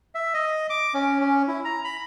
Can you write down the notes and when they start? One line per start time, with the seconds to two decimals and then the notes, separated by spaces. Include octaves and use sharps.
0.15 E5
0.34 D#5
0.70 D6
0.94 C#4
1.20 C#4
1.48 E4
1.65 A#5
1.84 B5